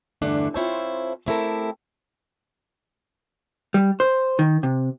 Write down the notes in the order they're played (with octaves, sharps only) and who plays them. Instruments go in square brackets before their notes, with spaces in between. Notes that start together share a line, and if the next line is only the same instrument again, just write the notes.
[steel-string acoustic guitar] E2 G2 D3 A3 D4
C4 E4 F4 A4 C5 C#5
A3 C4 E4 G4 A4 A#4
[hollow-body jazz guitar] G3
C5
D#3
C3